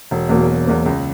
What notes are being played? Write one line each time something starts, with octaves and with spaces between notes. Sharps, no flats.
E1
E2 B2 F#3 A#3
E1
E2 B2 F#3 A#3
C#2